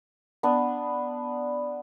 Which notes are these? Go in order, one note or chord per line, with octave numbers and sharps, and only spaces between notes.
B3 D4